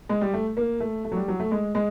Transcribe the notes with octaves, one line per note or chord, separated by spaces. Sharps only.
G#3
G3
A3
A#3
A3
A3
F#3
G3
F#3
A3
G#3
G#3